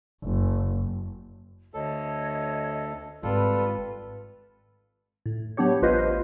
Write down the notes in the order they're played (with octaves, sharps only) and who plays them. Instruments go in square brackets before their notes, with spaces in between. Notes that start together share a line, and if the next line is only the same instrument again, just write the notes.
[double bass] F#1
[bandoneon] D2 A4 [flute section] C#5 D#5
[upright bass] G#1 [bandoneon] G3 F4 A4 [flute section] B4
[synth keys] A2
F#3 B3 D4 G4 C#5
A1 F4 B4 C5 D#5